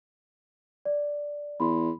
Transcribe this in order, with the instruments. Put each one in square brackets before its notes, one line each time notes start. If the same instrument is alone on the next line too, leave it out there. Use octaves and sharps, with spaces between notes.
[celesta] D5
[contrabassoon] E2 [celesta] B5 C6